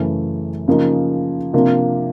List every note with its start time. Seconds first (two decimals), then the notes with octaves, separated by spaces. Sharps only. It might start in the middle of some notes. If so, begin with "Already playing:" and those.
Already playing: F#2 C#3 E3 A3 C#4
0.68 C#3 F3 A#3 D#4
1.53 C3 F3 A#3 D4 F4